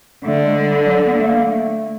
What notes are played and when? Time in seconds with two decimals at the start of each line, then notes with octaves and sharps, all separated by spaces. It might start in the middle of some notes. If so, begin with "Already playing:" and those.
0.24 D3 A3
0.45 G#3
0.58 G#3
0.66 G3
0.86 F#3
1.06 B3
1.13 A#3
1.20 A3
1.28 A#3
1.47 A3